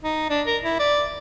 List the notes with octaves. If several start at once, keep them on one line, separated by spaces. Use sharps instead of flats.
D#4
D4
A#4
E4
D5